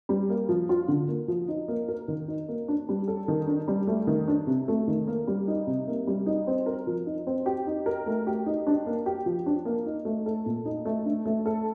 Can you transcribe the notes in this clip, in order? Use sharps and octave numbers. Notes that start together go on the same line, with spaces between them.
G3
A#3
F3
F4
D3
A#3
F3
D#4
A#3
A#4
D#3
D#4
A#3
D4
G3
A4
D#3
D4
G3
A3
D#3
D4
C3
A3
D#3
A#3
G3
D#4
C3
A#3
G3
D#4
C4
A#4
F3
D#4
C4
G4
D#4
A#4
A3
G4
D#4
D4
A#3
G4
F3
D4
A#3
D#4
A3
A4
A#2
D#4
A3
D4
A3
A4